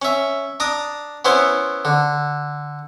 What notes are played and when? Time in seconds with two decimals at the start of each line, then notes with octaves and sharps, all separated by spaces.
0.02 C#4 E5
0.60 D4 A#5 D6 D#6
1.25 B3 C#4 E4 C5
1.85 D3